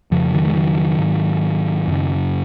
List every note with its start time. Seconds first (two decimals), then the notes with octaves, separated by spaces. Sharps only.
0.11 F2 C#3 F3
0.33 D#3 F#3
0.47 G#3
0.55 D#3 F#3
0.99 G#2
1.88 F#2 C#3